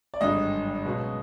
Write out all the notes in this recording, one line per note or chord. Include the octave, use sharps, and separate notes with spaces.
D5
G#1 G2 D3 F#3 D#5
C#2 B2 F#3